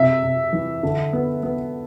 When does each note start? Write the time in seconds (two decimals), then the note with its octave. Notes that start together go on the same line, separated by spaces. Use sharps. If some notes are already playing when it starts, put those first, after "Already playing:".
Already playing: C3 E5
0.23 C3
0.53 E3
0.83 D3
1.13 B3
1.43 B3